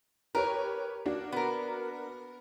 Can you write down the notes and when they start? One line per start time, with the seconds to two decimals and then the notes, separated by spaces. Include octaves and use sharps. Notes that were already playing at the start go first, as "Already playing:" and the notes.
0.35 G4 A#4 B4 C#5
1.06 A#3 D4 F#4
1.32 B3 A#4